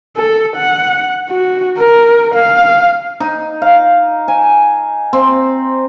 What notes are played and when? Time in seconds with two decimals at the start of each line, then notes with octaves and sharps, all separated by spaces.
0.16 A4
0.56 F#5
1.30 F#4
1.78 A#4
2.35 F5
3.20 D#4
3.62 F5
4.28 G#5
5.13 C4